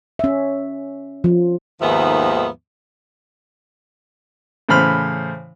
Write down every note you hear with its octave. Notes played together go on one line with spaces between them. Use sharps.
C#4 E5
F3
D#2 G#2 D#3 F3 B3 E5
A2 C#3 E3 C5 B5 F6